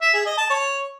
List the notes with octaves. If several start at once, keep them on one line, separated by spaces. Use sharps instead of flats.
E5
G#4
D#5
A5
C#5